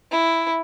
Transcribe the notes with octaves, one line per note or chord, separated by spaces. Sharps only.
E4